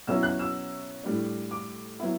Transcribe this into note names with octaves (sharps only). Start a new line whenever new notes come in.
B2 F#3 C#4 E4 E6
F#6
E6
A2 G3 D4
D6
F#3 B3 E4